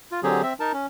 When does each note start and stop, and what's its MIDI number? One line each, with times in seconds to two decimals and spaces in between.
0.12 0.20 65
0.23 0.42 50
0.23 0.42 54
0.23 0.42 60
0.23 0.42 67
0.23 0.42 68
0.43 0.53 60
0.43 0.53 76
0.60 0.72 63
0.60 0.72 70
0.60 0.72 81
0.73 0.86 61